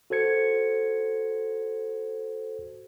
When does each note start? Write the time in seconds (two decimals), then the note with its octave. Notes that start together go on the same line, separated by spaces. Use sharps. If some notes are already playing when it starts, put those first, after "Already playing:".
0.10 F#4 A4 C5 G#6 C#7